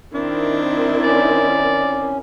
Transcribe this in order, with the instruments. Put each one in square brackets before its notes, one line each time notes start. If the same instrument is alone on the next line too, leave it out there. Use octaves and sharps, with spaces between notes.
[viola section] D#3 C4 E4 [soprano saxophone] D4
[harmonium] C#4 [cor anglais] D5